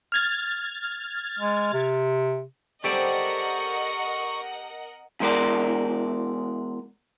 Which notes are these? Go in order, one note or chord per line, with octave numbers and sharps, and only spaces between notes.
F6 G#6 A6
G#3
C3
C4 G4 A4 A#4 D5 D#5 F#5 C#6
E2 G#3 A#4 D5